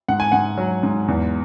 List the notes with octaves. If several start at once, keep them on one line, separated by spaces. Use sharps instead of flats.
G#2 F#5
G#5
G#2 F#5
F#3
G#2
E2